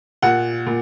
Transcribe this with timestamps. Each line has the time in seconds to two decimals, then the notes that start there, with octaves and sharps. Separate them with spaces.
0.22 A#2 F#5
0.67 A#2